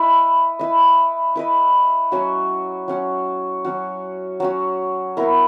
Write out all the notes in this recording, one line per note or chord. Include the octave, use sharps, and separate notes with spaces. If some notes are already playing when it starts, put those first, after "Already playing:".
Already playing: E4 B4 D#5
E4 B4 D#5
E4 B4 D#5
F#3 C#4 F#4
F#3 C#4 F#4
F#3 C#4 F#4
F#3 C#4 F#4
B3 E4 A#4